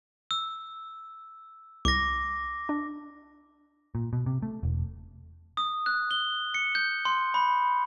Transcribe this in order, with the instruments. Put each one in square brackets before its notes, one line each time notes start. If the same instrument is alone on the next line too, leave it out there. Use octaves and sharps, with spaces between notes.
[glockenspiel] E6
[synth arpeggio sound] C2 [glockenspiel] D6 A#6
[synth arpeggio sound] D4
[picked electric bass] A#2
B2
C3
A3
E1
[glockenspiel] D#6
F#6
G7
C#7
G6
C6
B5